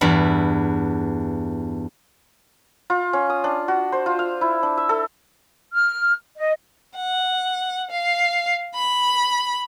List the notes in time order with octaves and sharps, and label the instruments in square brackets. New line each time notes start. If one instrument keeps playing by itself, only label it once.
[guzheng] E2 G2 E4
[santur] F4
C#4
D#6
D4
F#4
C5
F4
F5
E4
D4
E5
A4
[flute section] F6
D#5
[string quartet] F#5
F5
B5